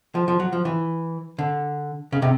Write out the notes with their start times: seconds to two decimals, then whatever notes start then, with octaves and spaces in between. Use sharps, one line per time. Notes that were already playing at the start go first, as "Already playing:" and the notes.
0.15 F3
0.28 F3
0.40 F#3
0.53 F3
0.65 E3
1.38 D3
2.12 C#3
2.22 C3